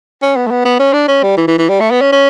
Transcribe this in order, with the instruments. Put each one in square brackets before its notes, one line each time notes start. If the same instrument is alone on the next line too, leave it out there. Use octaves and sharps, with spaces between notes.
[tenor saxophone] C#4
B3
A3
B3
B3
C#4
D4
C#4
G3
E3
E3
E3
G3
A3
B3
C#4
C#4